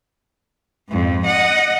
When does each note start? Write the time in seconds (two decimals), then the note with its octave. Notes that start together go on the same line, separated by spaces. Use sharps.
0.89 F2 G#2
1.26 D#5 F#5